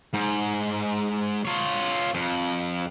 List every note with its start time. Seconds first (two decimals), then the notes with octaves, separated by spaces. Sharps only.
0.14 G#2
1.45 F4 C#5
2.14 F2